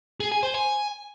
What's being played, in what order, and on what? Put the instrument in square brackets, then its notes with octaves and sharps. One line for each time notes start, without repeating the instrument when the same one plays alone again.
[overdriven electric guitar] G#4
G#5
C5
G#5